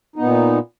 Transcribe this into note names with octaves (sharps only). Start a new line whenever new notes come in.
A#2 B3 D#4